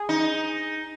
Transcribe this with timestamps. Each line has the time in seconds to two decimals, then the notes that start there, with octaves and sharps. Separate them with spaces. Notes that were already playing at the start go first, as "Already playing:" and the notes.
Already playing: G#4
0.09 D#4